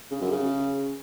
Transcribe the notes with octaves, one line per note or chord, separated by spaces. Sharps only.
C#3
F#2
C#3